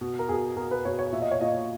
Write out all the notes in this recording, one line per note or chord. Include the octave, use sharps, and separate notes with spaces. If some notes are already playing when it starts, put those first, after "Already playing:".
B2
A#4
B2 G#4
B2 A#4
B4
B2 C#5
C#5
A#2 E5
D#5
C#5
A#2 D#5